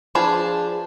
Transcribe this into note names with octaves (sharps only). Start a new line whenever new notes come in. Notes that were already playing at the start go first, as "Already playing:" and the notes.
F3 D4 G#4 B4 A5